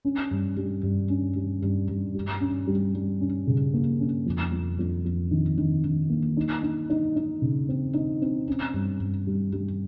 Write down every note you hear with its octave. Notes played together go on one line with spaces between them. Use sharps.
C#4
G2
G3
G2
C#4
G3
G2
G2
G3
C#4
G3
G3
C#4
C#3
A#3
C#4
F2
F2
F2
F2
D#3
D#3
D#3
A#3
D#4
D#4
D#4
D#4
C#3
C4
D#4
C4
C#4
G2
G2
G3
G3